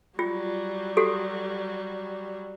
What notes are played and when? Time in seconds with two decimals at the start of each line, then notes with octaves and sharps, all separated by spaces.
0.19 F#3 G3 F4
0.97 F#4 G4 A4